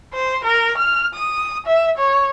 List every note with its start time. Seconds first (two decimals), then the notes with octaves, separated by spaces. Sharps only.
0.14 C5
0.44 A#4
0.77 F6
1.14 D#6
1.66 E5
1.97 C#5